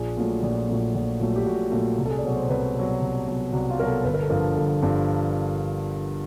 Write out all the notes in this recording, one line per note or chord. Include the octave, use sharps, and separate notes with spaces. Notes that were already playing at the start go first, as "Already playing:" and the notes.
Already playing: A#1 G#4
A#2 F#3 A3
A#1
A#2 F#3 A3
A#1
A#2 F#3 A3
G4
A#1 F#4
A#2 F#3 A3
C2
A4
G#4
D5
B2 F#3 C#5
C5
C2 B4
B2 F#3
C2
B2 F#3
C2 F#4
F4
B2 F#3 A4 A#4
G1 B4
A#4
A4
G2 D3 F3 A#4
G1 A4
G2 D3 F3